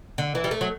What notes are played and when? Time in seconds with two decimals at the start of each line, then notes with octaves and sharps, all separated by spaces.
0.18 D3
0.35 E3
0.44 G3
0.51 A3
0.61 F#3